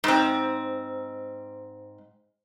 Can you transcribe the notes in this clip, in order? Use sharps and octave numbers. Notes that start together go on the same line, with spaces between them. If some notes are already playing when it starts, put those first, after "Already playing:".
G#2 C4